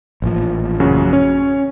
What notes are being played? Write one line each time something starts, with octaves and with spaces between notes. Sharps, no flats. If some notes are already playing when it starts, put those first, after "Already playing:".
A1 A#2 F3
F#2 C#3 F#4
C#4 C#5